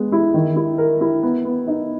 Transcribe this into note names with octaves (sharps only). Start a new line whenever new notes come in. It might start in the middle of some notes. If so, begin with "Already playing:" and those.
Already playing: G#3 B3
E4
D#3
E4
A#4
E4
B3
B3
D#4